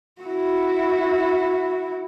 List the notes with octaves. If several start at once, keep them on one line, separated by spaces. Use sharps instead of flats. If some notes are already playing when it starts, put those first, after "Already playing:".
E4 F#4